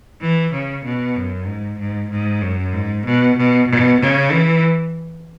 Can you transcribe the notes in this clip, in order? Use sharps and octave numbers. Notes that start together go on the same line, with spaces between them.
E3
C#3
B2
F#2
G#2
G#2
G#2
F#2
G#2
B2
B2
B2
C#3
E3